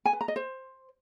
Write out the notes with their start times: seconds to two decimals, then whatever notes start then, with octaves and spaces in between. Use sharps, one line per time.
0.05 G#5
0.13 B4
0.21 A#5
0.28 D#5
0.36 C5